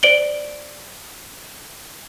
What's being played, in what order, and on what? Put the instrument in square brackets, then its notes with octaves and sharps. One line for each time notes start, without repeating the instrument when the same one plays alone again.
[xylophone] C5 D5 D7 F#7 G7